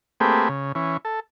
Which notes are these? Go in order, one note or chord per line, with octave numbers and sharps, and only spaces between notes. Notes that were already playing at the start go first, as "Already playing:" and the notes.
A3 A#3 C4 G4 G#4 B4
C#3
E3 C#4
A4